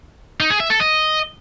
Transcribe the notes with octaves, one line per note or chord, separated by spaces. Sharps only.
D#4
G#4
E5
A4
D#5